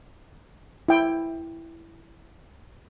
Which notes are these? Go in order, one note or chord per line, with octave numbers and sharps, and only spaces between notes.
E4 G5